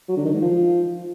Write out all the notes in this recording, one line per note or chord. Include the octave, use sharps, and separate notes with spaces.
F#3
D3
D#3
G#2
F3